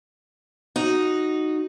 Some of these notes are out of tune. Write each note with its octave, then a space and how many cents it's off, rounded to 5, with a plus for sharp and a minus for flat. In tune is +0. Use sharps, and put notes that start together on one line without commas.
D#4 -5 F#4 +0